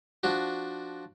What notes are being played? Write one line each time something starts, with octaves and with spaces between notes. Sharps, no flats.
F3 D4 F#4